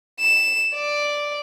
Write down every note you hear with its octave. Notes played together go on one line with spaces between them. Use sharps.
E7
D5